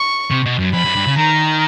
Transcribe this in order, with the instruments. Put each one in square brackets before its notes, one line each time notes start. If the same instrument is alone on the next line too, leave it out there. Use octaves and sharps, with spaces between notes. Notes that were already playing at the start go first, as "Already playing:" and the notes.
Already playing: [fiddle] C#6
[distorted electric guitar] C3
B2
F#2
[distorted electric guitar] F2 [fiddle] B5
[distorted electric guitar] F#2
G2
C#3
[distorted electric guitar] D#3 [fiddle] A#5